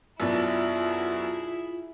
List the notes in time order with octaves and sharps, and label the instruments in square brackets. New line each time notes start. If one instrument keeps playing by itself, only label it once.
[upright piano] F#2 B2 D4 [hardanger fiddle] E4 G#4 [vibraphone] F4